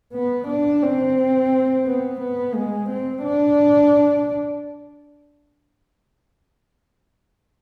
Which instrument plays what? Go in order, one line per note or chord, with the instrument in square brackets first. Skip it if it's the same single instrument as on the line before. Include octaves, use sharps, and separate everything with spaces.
[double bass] B3
D4
C4
B3
B3
G#3
C4
D4